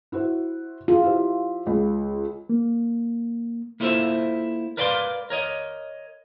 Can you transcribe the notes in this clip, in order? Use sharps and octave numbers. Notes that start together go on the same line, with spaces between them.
E4 F#4 C5
F4 G#4
E4 G4 C5
C#2
A#3
A#3 E4 F4 A4 C5 E5
A#4 B4 D5 F5 G5 C6
A#4 C#5 D#5